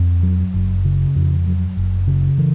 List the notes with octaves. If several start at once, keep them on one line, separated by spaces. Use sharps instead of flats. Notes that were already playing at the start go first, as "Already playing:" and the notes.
Already playing: F2
F#3
F#1
C#3
F2
F#3
F#1
C#3
E3